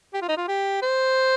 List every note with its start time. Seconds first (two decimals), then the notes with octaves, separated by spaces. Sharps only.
0.13 G4
0.21 F4
0.29 D#4
0.37 F4
0.48 G4
0.82 C5